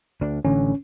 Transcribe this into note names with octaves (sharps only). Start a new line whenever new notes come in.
D2 D4
A1 D3 C#4